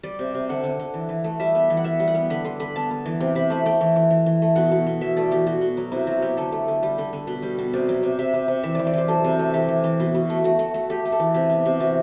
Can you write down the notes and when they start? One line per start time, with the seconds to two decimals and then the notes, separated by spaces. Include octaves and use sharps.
0.03 G3 D5
0.19 C3
0.35 C3
0.49 D3 F#5
0.64 D3
0.80 D3
0.94 E3
1.09 E3
1.24 A3
1.40 G3 E5
1.55 B3
1.70 E3
1.77 F#5
1.84 B3 E5
2.00 G3
2.08 F#5
2.15 B3
2.30 D3 B5
2.45 D3 C6
2.60 D3 B5
2.76 B3 A5
2.91 B3
3.06 E3
3.20 C3 G5
3.35 C3 B5
3.50 A3 B5
3.66 A3 G5
3.81 E3
3.96 E3
4.10 E3
4.26 E3
4.42 A3
4.56 B2 F#5
4.71 B2
4.87 B2
5.01 E3 E5
5.17 A3 D5
5.31 E3 G4
5.47 B2 F#4
5.61 B2
5.77 F#3
5.92 C3 E4
6.07 F#3 F#4
6.22 B3 G4
6.37 D3 A4
6.52 A3
6.68 D3
6.83 G3
6.98 D3
7.13 D3
7.27 B2 B4
7.42 G3
7.59 B2
7.73 C3 D5
7.89 F#3
8.03 C3
8.19 C3 E5
8.34 C3
8.48 C3
8.63 E3 E5
8.75 E3 D5
8.87 D5
8.93 E3 C5
9.08 F#3 A4
9.24 C3
9.39 A3
9.54 E3 G4
9.69 E3
9.84 E3
10.00 B2
10.15 B2
10.30 A3
10.44 A3 F#4
10.59 A3
10.74 A3
10.90 A3 G4
11.05 A3
11.12 A4
11.20 E3
11.34 C3 G4
11.50 B3
11.66 C3
11.80 E3 F#4